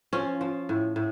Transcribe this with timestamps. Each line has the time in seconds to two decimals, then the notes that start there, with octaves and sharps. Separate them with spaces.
0.13 F3 C#4
0.41 F3
0.69 A2
0.96 A2